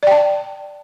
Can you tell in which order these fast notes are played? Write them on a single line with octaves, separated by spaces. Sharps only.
D5 G5 A5